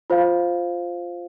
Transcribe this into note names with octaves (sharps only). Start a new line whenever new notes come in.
F4 C5 F5